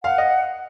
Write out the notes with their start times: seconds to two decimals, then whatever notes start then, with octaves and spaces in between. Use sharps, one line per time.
0.04 F5 F#5
0.18 D#5